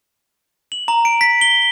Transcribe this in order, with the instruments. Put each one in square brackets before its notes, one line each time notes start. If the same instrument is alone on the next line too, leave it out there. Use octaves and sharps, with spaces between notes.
[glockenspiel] F#7
A#5
D7
B6
G7